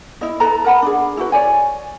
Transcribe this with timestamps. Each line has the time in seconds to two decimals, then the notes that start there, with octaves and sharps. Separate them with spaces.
0.21 E4 D#5
0.40 A4 B4 A5 A#5
0.64 A#4 F#5 B5
0.82 D4 G#4
1.17 E4 F#4 B4
1.32 C#5 D5 G#5